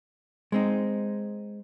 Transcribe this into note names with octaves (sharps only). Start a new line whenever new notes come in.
G#3 C4 D#4